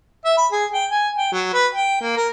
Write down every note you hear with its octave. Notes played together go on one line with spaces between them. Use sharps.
E5
B5
G#4
G5
G#5
G5
F#3
B4
G5
A#3
A#4